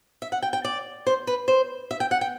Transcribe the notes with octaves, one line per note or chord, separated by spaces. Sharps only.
E5
F#5
G5
G5
D5
C5
B4
C5
E5
G5
F#5
G5